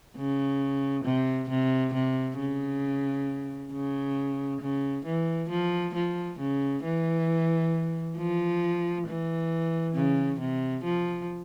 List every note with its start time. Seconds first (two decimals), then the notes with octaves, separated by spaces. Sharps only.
0.16 C#3
1.05 C3
1.50 C3
1.94 C3
2.39 C#3
3.72 C#3
4.61 C#3
5.06 E3
5.50 F3
5.95 F3
6.39 C#3
6.84 E3
8.18 F3
9.07 E3
9.95 C#3
10.40 C3
10.85 F3